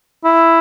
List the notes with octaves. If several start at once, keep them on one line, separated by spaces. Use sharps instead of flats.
E4